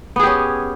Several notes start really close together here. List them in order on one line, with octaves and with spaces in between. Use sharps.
B3 G#4 G4 C#4